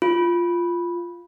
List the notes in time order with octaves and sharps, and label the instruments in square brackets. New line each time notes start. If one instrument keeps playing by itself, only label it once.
[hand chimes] F4